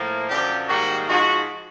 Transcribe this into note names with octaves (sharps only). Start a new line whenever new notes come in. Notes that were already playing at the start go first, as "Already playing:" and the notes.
Already playing: A2 F3 A#3
F#2 D3 F3 G4
G#2 D#3 G3 A#3 F#4
G#2 F3 G#3 F#4